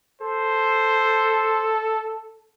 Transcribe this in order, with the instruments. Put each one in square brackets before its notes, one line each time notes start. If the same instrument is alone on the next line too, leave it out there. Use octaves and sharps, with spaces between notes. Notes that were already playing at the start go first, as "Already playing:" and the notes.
[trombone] A4 [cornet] C5